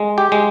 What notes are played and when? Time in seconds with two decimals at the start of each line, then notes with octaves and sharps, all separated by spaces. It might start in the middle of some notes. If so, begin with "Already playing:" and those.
Already playing: G#3
0.18 G4
0.32 G#3